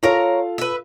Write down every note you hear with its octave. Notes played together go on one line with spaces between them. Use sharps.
F4 A4 A#4 C#5 F5 A#5
B4 E5